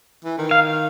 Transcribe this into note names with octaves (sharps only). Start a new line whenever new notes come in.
E3
D#3
F5